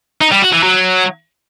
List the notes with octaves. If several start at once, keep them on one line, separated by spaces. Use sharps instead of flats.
D#4
G3
F#4
E3
F#3